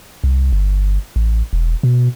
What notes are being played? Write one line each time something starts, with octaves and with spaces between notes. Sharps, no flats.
C2
G1
A1
E1
B2